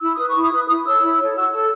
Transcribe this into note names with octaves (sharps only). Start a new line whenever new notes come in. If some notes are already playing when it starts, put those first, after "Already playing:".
E4 E6
B4 D#6
C#6
E4
D#6
B4
E4 D#6
A4 C#5 E6
E4
A4 C#5
F#4 E6
A4 C#5 E6